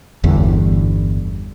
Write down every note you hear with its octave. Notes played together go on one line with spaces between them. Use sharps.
G1 E2 G2 D3